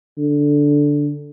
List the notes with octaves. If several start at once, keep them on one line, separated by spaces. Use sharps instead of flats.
D3